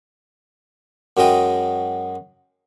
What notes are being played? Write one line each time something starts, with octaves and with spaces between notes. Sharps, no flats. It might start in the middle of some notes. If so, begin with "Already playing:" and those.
F#2 F#3 G#3 D#5 G5